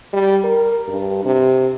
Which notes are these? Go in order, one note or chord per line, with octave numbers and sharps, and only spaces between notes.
G3
A#4
G2
C3